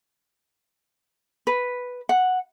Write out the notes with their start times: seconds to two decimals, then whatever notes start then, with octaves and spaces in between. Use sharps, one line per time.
1.47 B4
2.09 F#5